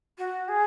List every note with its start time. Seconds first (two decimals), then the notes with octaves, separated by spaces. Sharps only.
0.18 F#4
0.48 G#4